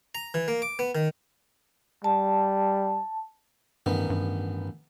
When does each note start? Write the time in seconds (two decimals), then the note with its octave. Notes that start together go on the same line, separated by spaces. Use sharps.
0.15 A#5
0.34 E3
0.48 A#3
0.62 D6
0.79 B3
0.95 D#3
2.04 G3 A5
3.86 A1 G2 D#3 B3
4.10 G2